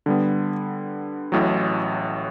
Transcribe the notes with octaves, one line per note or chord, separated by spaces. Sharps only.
D3 G3 B3
A1 A2 F#3